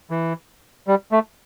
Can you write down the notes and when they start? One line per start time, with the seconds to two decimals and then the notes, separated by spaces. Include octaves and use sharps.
0.10 E3
0.87 G3
1.12 A3